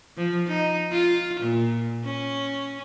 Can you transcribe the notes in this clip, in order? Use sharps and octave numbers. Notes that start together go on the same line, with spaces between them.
F3
D#4
F4
A#2
C#4